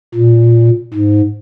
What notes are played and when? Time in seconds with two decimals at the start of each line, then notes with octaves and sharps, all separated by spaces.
0.15 A#2
0.93 G#2